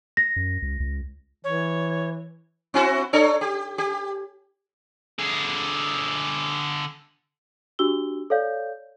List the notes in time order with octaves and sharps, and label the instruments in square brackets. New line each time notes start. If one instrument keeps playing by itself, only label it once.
[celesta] A#6
[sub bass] F#2
C#2
C#2
[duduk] E3 [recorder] C#5
[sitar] C4 E4 F#4
D4 A4 C#5
G4
G4
[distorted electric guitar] D3 G#4
[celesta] D4 F#4 G4 E6 G7
A4 C#5 D5 F5 G6